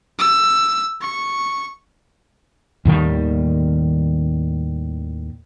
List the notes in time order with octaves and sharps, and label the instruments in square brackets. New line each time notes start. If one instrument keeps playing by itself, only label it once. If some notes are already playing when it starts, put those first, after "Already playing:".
[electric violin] E6
C#6
[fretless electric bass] D#2 A2 D#3 G3